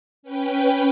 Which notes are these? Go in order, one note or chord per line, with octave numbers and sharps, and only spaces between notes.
C#4 B4 G5